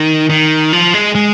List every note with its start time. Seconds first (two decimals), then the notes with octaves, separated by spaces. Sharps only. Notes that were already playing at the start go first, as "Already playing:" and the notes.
Already playing: D#3
0.30 D#3
0.73 F3
0.94 G#3
1.15 G#3